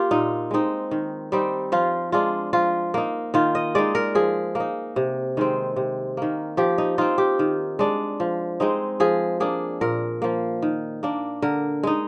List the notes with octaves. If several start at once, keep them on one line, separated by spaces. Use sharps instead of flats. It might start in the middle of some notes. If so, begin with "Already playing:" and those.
Already playing: A#3 F4 G4
A#2 D#4
G#3 C4 D#4
D#3
G3 C4 D#4
F3 F4
G#3 D4 F4
F3 F4
A#3 D#4
D#3 F4
D#5
G#3 D#4 D5
A#4
F3 G#4
A#3 D#4
C3
D#3 G#3 C4
C3
D#3 A#3
F3 G4
D#4
C4 D#4 F4
G4
D#3
G#3 D4
F3
G#3 C4 D#4
F3 G#4
A#3 D4 G#4
A#2 A#4
F3 A#3
D#3
A#3 D4
D3 A#4
G#3 D#4